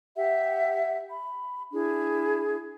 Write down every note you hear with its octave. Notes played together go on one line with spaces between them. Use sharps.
G4 E5 F#5
B5
D4 E4 G#4